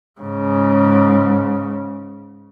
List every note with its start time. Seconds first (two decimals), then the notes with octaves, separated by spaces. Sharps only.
0.21 G#2 C#3